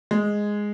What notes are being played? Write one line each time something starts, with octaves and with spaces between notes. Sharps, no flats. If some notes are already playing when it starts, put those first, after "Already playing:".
G#3